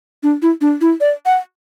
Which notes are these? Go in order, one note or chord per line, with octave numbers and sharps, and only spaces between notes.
D4
E4
D4
E4
D5
F#5